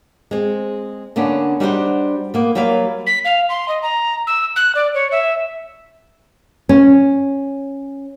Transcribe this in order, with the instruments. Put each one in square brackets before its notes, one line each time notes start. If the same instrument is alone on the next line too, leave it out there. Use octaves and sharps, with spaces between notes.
[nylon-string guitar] G#3 C4
D3 A#3 B3 C#4 D4
G3 D4 D#4 F#4 G4 C5
A#3 B3
F#3 G3 A#3 B4 F5
[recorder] B6
F5
C6
D#5
A#5
E6
F#6
D5
C#5
E5
[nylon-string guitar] C#4